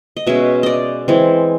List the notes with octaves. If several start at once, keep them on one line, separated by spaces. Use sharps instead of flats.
D#5
B2 G#3 C#4 E5
D5 D#5
E3 G#3 C4